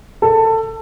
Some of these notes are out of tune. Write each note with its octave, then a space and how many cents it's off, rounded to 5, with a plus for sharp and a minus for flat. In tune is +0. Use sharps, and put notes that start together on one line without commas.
A4 +20